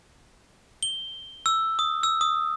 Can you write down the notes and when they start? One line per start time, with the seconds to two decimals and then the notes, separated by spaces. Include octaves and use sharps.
0.83 G7
1.46 E6
1.79 D#6
2.03 E6
2.21 D#6